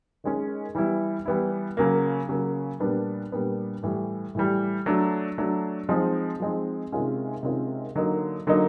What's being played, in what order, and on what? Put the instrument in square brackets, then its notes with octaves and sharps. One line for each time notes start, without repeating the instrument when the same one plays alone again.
[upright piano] D#3 G#3 C#4
E3 G3 B3 E4
E3 G3 B3 E4
C#3 F#3 A#3
C#3 F#3 A#3
A#2 G3 B3 D4
A#2 G3 B3 D4
A2 E3 G3
A2 E3 G3
F#3 A3 D4
F#3 A3 D4
F3 G#3 C4 D#4
F3 G#3 C4 D#4
C3 D#3 G#3 C#4 F4
C3 D#3 G#3 C#4 F4
D3 F#3 A#3 D#4
D3 F#3 A#3 D#4